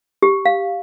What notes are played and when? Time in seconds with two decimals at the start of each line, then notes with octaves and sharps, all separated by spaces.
0.22 G4
0.46 F5